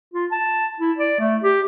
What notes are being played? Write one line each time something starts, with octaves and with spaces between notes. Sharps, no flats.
F4
A5
E4
D5
A3
G4